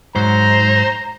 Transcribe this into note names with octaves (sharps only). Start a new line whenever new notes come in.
G#2 F#3 C5 A#5